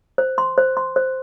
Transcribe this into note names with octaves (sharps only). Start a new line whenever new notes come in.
C5
C6
C5
C6
C5